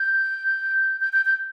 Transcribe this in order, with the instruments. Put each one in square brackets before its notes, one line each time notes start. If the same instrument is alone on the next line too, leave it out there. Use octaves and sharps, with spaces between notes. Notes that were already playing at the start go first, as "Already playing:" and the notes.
Already playing: [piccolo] G6
G6
G6
G6